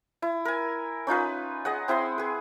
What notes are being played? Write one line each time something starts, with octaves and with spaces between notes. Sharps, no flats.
E4
A#4 G#5
C#4 D#4 F4 B4
G#4 D#5 F#5
C4 E4 G#4 C6
G#4 B4